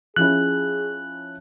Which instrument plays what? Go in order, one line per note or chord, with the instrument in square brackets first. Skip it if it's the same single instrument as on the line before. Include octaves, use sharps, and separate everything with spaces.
[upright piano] F3 C#4 E4 [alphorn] G#4 [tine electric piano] F#6